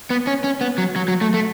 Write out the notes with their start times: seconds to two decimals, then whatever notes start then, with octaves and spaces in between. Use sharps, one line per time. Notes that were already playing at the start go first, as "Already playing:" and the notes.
0.10 B3
0.27 C#4
0.44 C#4
0.61 B3
0.78 F#3
0.96 F#3
1.08 F#3
1.21 A3
1.34 A3